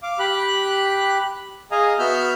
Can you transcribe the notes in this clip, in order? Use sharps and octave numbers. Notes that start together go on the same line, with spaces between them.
F5 D6
G4 B5 F#6
G#4 D#5 F5 G#5 A#5
B3 F#4 E5 F6 G6